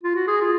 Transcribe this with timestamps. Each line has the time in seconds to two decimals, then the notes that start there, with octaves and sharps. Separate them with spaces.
0.03 F4
0.15 F#4
0.27 G#4
0.41 F4